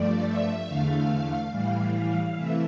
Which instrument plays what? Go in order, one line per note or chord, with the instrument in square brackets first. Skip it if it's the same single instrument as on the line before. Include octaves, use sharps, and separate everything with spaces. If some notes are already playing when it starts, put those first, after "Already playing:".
Already playing: [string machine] G2 F3 A3 D5
E5
E2 D3 A3 F5
A2 E3 G3 F5
F5
C3 E3 A3 E5